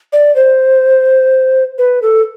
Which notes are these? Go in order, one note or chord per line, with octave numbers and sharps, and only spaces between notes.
D5
C5
B4
A4